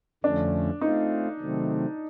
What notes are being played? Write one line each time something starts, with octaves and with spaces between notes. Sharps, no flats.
F2 D3 F3 A3 C#4 D4
A3 C4 D#4 F4
C3 D#3 F#3 A3 C4